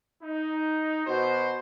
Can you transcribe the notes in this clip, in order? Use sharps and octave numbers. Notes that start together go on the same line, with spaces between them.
D#4
B2 F#4 C5